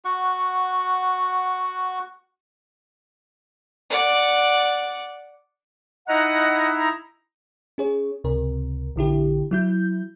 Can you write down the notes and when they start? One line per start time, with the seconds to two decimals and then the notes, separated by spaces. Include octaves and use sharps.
0.05 F#4 F#5 C#6
3.90 D5 F#5
6.08 D#4 E4 D#5 F#5 A#5
7.78 C#4 G#4 C#5
8.24 C#2 C3 A#4
8.96 A#1 D3 E4 G4
9.51 F#3 E4 G6